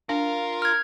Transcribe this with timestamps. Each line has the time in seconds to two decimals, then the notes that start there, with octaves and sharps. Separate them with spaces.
0.09 D4 F4 A#4
0.62 F6 G#6